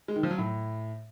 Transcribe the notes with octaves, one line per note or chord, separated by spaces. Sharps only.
G#3
D#3
F3
F#3
A2